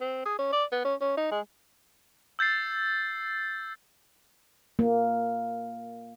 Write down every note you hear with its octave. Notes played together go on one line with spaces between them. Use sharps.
C4
G#4
C#4
D5
B3
C#4
C#4
D#4
G#3
E6 G6 A6 C7
A#3